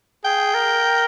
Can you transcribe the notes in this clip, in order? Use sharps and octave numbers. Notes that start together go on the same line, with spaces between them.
G#4 G5
A#4